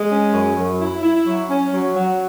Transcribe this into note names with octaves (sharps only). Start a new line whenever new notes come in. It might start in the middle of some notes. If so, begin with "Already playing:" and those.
Already playing: G#3
C#4
F#2
F#2
E4
E4
F#3
C#4
F#3
F#3